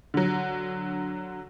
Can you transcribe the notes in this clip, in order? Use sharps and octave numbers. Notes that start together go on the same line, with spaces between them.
D3 F#3